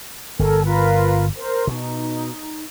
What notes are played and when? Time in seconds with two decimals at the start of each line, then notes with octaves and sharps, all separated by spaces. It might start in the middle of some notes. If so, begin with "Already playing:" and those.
0.39 G1 A4 A#4 G#5
0.65 F4 A#4 B4
1.37 A#4 C5
1.67 B2 D#4